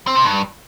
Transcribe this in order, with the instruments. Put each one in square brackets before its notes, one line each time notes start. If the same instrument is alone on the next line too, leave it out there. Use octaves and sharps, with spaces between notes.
[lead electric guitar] C4
C3
G2